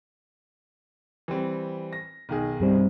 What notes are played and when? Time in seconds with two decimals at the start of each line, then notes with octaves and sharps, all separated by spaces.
1.28 E3 G3 C4
1.93 A#6
2.29 B1 D#3 G#4
2.60 G2 G3 C4